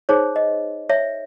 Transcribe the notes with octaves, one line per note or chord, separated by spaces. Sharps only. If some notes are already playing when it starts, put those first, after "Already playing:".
D#4 G#4 C5 C#5
D#5
C#5 E5